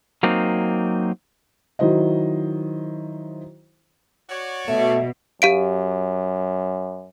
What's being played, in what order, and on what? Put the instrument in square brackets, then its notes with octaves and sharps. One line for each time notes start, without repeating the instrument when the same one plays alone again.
[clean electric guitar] F#3 A#3 C4 D#4
[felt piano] D#3 F#3 E4 C5 D#5
[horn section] F#4 C#5 D5
[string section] B2 [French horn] A3 [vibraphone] E5
[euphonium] F#2 [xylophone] G4 F5 D7